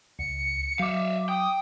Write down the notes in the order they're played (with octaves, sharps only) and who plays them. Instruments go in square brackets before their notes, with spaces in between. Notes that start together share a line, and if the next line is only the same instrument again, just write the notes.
[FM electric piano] C#2 [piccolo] C#7
[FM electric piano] F#3 D6 [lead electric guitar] E5 F5
[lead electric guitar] G5 [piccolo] D#6